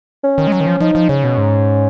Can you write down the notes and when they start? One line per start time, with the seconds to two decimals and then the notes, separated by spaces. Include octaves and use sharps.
0.24 C#4
0.38 D#3
0.47 G#3
0.52 F#3
0.60 D#3
0.67 F3
0.81 F3 D#4
0.95 F3
1.09 C#3 C#4
1.24 B2
1.38 G#2